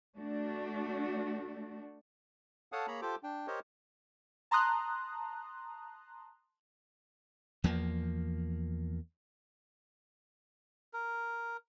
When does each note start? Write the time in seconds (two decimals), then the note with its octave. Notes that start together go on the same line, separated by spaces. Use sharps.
0.16 A3 D4 F#4
2.72 A4 C#5 F5 F#5 A5 D#6
2.88 A#3 G#4 C#5 A#5 B5
3.02 F4 G4 A4 C5 D6
3.23 D4 G5
3.47 G4 A#4 C5 C#5 D#5
4.51 A5 A#5 C6 D#6 F#6
7.64 E2 F3 A#3
10.93 A#4